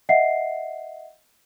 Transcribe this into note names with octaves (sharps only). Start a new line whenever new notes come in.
D#5 E5 F#5 C7